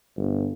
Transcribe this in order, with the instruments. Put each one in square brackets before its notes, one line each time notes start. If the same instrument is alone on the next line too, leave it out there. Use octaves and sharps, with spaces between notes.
[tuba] G1